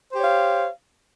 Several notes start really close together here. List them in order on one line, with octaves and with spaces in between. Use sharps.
C5 G4 C#5 F5